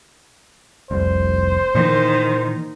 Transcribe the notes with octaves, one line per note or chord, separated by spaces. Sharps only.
F1 C2 C5
A#2 D#3 E3 A#3